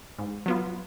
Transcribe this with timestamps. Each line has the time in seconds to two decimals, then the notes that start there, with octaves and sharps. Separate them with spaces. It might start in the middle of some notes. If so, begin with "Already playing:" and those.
0.19 G#2
0.46 F#3 B3 F4